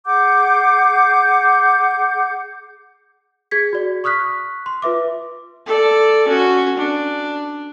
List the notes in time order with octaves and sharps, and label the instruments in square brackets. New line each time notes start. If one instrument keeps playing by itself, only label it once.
[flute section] G#4 F#5 D6 G6
[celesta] G#4 G#6 B6
F#4 D5
C#6 D#6 F6 F#6 B6
C6
F4 B4 E5 D6
[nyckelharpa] A4 D5
C#4 F#4
D4